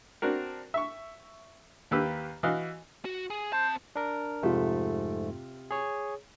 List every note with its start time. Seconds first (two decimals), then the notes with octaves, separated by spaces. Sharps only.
0.22 C4 D4 F#4 A#4
0.74 E5 C#6
1.91 D#2 A#3 G4 B4 E6
2.43 E3 F#4 D#5 F5
3.05 F#4
3.30 G#4
3.53 C4 C5 A5
3.96 D4 A#4
4.42 F2 G#2 C3 A3 F4
5.71 G#4 C#5